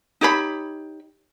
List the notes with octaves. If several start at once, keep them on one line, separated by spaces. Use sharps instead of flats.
D#4 G4 C#5 B5